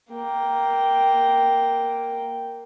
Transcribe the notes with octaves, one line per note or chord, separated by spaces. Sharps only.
A#3 G5